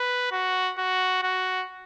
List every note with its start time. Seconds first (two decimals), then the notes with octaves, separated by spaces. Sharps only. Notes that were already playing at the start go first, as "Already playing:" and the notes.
Already playing: B4
0.32 F#4
0.78 F#4
1.23 F#4